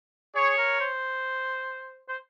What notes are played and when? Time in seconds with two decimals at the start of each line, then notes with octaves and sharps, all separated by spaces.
0.35 G#4 C#5
0.58 A#4
0.80 C5
2.09 C5